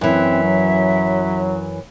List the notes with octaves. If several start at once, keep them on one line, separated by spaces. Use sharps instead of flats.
F#2 E3 C4 E5
F#3